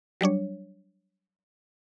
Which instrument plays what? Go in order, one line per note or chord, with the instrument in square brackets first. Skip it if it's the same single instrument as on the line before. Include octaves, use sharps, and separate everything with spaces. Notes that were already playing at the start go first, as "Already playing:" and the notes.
[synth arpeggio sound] F#3 G3 D4 C#5